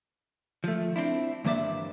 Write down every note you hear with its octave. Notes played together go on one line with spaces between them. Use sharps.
F3 A3
C4 D4 E4
G2 E3 A#3 C5 D5 E5